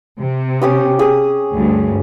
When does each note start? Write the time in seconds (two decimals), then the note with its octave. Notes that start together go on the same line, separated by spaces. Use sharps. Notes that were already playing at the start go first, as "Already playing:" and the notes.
0.20 C3
0.62 C#4 G4 D#6
0.99 G#4 D#6
1.54 D2 G2